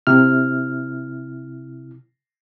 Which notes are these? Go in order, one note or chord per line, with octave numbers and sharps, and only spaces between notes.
C3 E4 F6